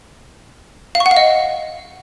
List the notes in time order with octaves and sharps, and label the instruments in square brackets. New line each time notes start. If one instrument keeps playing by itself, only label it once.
[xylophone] F5
C#6
F#5
F5
D#5